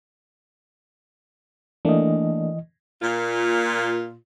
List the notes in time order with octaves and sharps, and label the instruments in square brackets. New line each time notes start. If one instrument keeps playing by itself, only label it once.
[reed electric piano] E3 D#5 [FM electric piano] A3 A#3 D4
[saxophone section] A#2 F4